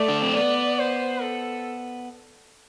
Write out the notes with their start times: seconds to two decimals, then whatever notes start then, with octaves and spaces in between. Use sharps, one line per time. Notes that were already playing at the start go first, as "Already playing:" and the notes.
Already playing: A3 D5
0.08 D4
0.22 C4
0.35 B3 D5
0.79 C5
1.22 A4